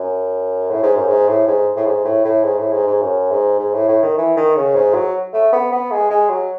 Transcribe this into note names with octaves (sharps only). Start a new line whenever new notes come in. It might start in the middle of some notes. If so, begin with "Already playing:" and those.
Already playing: F#2
A2
G#2
F#2
G#2
A2
G#2
A2
G#2
A2
A2
G#2
A2
G#2
G#2
F#2
G#2
G#2
A2
A2
D#3
E3
D#3
C#3
G#2
F#3
A3
B3
B3
G#3
G#3
F#3